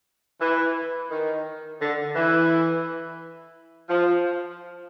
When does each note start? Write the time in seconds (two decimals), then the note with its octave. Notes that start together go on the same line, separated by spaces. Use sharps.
0.41 E3
1.10 D#3
1.81 D3
2.15 E3
3.89 F3